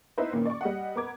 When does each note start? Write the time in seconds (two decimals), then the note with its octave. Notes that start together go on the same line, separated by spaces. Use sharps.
0.18 B3 D#4 E4 B4 C5
0.33 A#2 D#3 A#3 C#4
0.45 D5 C#6
0.61 G3 D#5 F#5
0.95 B3 A#4 D6 G#6